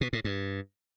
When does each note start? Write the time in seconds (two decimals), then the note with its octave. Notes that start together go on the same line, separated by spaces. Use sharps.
0.01 B2
0.13 A2
0.24 G2